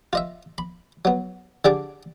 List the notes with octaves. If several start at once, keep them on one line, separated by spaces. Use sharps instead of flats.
F4 D#5 E5
B5
F#3 B3
D3 D4 G4 G#4 D5 D6